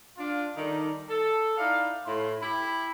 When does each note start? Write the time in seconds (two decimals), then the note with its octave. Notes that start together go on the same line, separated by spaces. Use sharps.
0.16 D4 F4
0.55 D#3 G3 D#4 A4 D5
1.09 A4
1.57 D#4 E4 D5 F5
2.05 A2 E4 C6
2.41 E4 G4 B5